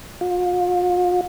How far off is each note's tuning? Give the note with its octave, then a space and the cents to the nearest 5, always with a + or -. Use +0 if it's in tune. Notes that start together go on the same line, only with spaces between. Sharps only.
F4 +40